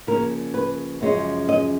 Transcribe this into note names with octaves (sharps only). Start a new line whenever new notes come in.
C#3 F3 A#3 C#4 A#4
B4
F#2 C#3 F3 G#3 C#4
D#5